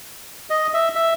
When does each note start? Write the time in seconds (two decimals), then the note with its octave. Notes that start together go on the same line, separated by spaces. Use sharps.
0.50 D#5
0.74 E5
0.95 E5